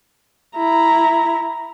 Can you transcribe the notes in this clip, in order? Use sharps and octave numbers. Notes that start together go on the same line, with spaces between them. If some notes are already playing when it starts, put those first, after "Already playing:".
E4 A#5